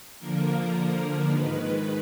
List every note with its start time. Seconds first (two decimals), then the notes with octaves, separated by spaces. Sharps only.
0.19 D3 F3 A#3 A#4
1.25 G#2 D#3 G#3 B4